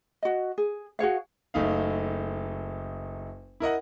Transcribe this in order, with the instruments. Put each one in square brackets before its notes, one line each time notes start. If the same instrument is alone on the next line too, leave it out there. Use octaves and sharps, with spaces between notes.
[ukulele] F#4 D#5
G#4
F#4 G#4 C#5 F5
[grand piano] F#1 A3 D#4 F5
E4 A#4 D#5 F#5